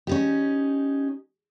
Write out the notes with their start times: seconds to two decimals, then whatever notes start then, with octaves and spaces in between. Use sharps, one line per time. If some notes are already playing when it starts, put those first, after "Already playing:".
0.07 C#4 D#4 G4